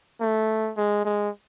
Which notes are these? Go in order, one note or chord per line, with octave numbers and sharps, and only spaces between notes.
A3
G#3
G#3